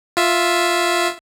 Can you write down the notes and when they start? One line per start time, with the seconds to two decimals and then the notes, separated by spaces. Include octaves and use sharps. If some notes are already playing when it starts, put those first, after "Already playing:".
0.17 F4 E5